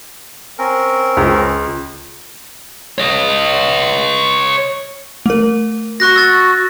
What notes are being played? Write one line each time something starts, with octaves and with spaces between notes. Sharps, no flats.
C4 C#4 A#4
C#2
C#5 D#5
A3 A#4
F#4 C#6 F#6 A#6
E6 A6